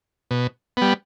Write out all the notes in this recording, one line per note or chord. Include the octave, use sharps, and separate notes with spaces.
B2
G3 B3